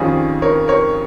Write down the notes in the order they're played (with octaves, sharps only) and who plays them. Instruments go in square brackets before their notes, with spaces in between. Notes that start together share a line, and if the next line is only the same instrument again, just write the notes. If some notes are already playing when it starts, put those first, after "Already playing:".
Already playing: [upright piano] F2 D#3 G3 C#4 F4 G#4
A#4 C#5
A#4 C#5